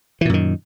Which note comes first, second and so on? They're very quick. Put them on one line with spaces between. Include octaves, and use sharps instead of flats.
E3 A#2 F#2 D#3